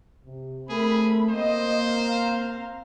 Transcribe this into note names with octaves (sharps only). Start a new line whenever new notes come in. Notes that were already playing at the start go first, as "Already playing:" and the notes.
C3
A3 C4 G#4 A#4 B5
A#3 C4 C5 D#5
C4 F5 A#5